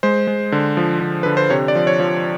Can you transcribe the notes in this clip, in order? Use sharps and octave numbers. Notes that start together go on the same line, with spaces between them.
G#3 C5
G#3
D3
F3
D3
D3 B4
C5
C3 C#5
D5
F3
C#5
F3